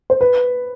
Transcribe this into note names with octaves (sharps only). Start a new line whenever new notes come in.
C5
B4